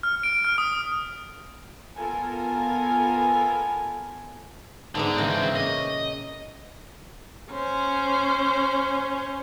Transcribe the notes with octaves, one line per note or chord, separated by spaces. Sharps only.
F6
D7
F6
D#6
B3 F4 A4 A#4 G#5
G#2 D3 B3 D4
C#3 E3 G#3 C4 A#4
A#2 C#4 D#5
C#4 C5